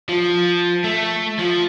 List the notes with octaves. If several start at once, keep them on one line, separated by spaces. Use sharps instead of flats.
F3
A3
F3